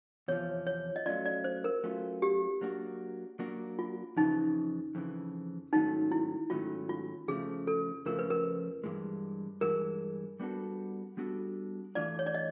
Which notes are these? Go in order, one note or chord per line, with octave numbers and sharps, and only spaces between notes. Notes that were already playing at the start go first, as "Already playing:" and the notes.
E2 C3 F3 C#5
C#5
D#5
F#3 A3 C#4 F4 D5
D5
C5
A#4
F#3 A3 C#4 F4
G4
F#3 A#3 D4 F#4
F#3 A#3 D4 F#4
F4
F2 C#3 E3 D#4
F2 C#3 E3
G#2 D#3 F#3 A3 C#4 D#4
E4
G#2 D#3 F#3 A3 C#4 F4
F4
F2 C#3 F3 A3 G#4
A4
F2 C#3 F3 A3 A#4
B4
A#4
G2 E3 G#3
G2 E3 G#3 A#4
G3 B3 D4 F#4 A4
G3 B3 D4 F#4 A4
E3 A3 D4 F4 D5
C#5
D5
D#5